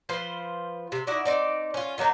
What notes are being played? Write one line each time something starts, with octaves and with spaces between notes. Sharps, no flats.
F3 F4 B4 C5
C3
D#4 E4 F#4 D5
C4 D#4 D5
C#4 F4
D#3 F#3 A#3 D#4